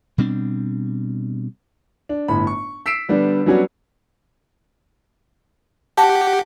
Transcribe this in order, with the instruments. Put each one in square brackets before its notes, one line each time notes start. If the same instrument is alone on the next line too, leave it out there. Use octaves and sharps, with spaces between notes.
[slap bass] B2 G3 C4 D4
[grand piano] D4
G1 A2 B5
C#6
E6 B6 C7 D7 E7
D3 G3 B3 D4
F#3 G3 B3 C#4 D4 F#4
[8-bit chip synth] G4 [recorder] F#5 [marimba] A5